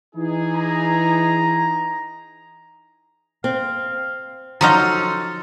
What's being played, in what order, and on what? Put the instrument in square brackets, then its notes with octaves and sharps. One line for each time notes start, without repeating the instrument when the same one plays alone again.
[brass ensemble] E3 D#4 G#4
[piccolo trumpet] A#5
[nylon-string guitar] C4 [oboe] F5
[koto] F3 F#3 D#4 [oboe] A4 [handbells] A#5 C6 F6